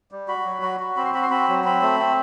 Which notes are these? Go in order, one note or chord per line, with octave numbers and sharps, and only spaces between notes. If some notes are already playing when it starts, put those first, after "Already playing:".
G3
F#4 B5
F#3
F#4
F#4
C4 B5
C6
F#4 B5
C6
C4 B5
F#3
C4 B5
A3
C4